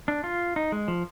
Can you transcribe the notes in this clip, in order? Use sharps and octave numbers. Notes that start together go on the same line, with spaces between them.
D4
F4
D#4
G#3
F3